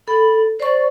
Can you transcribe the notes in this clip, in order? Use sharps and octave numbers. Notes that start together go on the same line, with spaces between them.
A4 B5
C5 D5 C#6